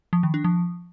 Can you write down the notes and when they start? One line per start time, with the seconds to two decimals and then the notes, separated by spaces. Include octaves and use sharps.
0.13 F3
0.23 D#3
0.34 D4
0.44 F3